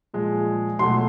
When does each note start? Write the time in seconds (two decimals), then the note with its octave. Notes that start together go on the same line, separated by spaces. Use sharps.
0.14 A#2 F3 G#3
0.79 B2 F#3 A3 C6